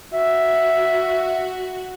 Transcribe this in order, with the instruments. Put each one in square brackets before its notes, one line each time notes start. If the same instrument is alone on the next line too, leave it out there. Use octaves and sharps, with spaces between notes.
[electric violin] F#4 [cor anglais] E5